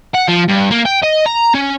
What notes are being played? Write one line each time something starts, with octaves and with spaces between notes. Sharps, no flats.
F#5
F3
G2
A#3
G5
D#5
A#5
C#4